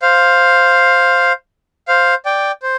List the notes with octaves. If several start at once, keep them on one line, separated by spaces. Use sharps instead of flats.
C5 F5
C5 F5
D5 G5
C5